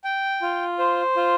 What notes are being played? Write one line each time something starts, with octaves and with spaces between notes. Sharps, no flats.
G5
F4
C5
F4